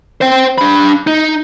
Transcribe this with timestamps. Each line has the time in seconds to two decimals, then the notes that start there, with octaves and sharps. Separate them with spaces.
0.21 C5 G5
0.58 D4 B5
1.07 D#4